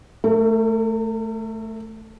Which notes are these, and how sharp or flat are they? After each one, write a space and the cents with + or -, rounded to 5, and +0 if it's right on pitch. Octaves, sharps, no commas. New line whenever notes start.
A3 +0 A#4 -45